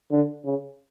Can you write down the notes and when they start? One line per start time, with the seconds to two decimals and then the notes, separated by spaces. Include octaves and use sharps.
0.11 D3
0.45 C#3